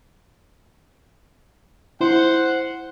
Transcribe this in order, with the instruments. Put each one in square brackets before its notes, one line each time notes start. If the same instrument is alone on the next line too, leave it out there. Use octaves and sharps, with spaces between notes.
[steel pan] E4 C6 [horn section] C5 F#5